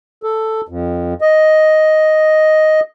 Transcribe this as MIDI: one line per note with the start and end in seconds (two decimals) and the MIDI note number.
0.23 0.61 69
0.68 1.14 41
1.21 2.80 75